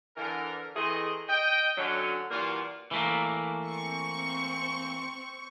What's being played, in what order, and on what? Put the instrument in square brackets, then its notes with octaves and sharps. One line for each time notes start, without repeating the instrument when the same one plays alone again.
[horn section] D3 E3 A#4
C3 E3 A3 G#4 D#5
D#5 G5
D3 F#3 C#4
A#2 E3 G3 A#3 F4 F#4
[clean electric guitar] E3 A3 A#3
[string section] C4 C#6